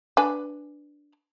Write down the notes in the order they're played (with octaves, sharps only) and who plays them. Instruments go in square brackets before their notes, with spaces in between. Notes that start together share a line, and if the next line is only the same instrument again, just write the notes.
[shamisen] D4 B4 G#5